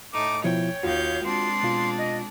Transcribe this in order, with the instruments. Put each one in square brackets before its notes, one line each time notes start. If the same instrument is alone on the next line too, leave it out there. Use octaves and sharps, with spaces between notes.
[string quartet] A2 A3 D#4 [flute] D6
[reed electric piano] B2 F3 E4 [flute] C#5 [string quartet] G5
[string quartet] D#2 F5 G6 [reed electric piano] F4 F#4
[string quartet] G#3 C4 D4 [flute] C6
[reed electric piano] B2 F4
[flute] D#5